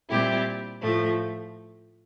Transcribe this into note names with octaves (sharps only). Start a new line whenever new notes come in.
A#2 G3 C4 E4 G4
A2 F3 A3